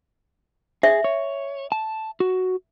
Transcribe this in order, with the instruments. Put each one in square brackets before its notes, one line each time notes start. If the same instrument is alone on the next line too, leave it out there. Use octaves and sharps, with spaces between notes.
[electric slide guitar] G#4 [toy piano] E5
[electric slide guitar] C#5
A5
F#4